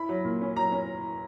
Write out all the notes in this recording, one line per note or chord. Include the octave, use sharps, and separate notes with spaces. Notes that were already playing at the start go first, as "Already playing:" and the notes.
Already playing: E4 B5
F#3
A#2
C#4
F#3 A#5
C#4